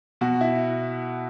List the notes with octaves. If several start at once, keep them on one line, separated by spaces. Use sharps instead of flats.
B2 F#4
E4